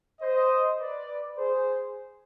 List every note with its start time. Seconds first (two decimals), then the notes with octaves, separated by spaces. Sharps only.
0.21 C5 D#5
0.80 B4 D5
1.39 G#4 C5